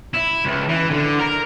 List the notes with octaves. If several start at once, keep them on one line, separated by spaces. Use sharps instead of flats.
E4
C#2
E3
D3
A#4